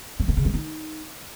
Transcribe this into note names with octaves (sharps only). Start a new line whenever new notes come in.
F#3
D3
C#3
F#3
D#4